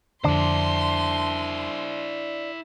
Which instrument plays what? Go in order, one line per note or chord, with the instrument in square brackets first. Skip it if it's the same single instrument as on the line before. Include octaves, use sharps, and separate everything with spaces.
[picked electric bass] F2 D3 [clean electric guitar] D4 [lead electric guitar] E4 C5 [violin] C6